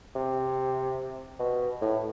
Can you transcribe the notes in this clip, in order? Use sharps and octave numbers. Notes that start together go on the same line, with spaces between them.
C3
B2
A2